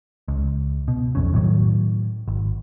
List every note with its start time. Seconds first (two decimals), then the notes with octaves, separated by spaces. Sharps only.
0.28 C#2
0.88 B2
1.15 B1 F2 C#3
1.34 A2 D#3 F#3
2.28 G#1